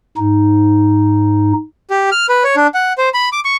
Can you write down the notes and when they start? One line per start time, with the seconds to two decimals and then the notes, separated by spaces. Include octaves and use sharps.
0.17 G#2 D#4
1.90 G4
2.12 F6
2.29 B4
2.44 C#5
2.56 D4
2.74 F#5
2.98 C5
3.14 B5
3.32 D6
3.45 C#6